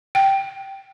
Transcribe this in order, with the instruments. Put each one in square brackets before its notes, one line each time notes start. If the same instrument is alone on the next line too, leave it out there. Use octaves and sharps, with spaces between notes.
[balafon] G5